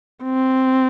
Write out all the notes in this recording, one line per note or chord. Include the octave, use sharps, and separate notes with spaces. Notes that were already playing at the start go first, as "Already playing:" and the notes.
C4